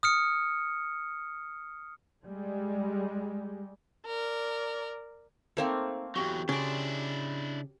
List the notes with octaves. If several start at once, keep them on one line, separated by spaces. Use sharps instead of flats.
D#6 F6 C#7
G3 G#3
A#4 D5
A3 A#3 C4 D#4 C5 A5
E2 F#3 F#4 G4
C#3 D4 E4 D5 C6